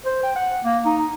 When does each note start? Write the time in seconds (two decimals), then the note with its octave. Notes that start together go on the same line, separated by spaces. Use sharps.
0.06 C5
0.23 G5
0.36 F#5
0.65 A#3
0.85 D#4